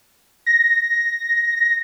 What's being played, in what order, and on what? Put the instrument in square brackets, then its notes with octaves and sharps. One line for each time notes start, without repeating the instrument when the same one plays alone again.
[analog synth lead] A#6